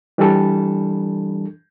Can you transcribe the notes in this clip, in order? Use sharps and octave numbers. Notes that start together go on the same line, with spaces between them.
E3 G3 D4 A4